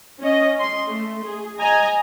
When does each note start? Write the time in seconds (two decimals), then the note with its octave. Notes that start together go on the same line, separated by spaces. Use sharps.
0.21 C#4 D#5
0.59 C6
0.88 A3
1.24 G#4
1.59 D#5 G#5 A#5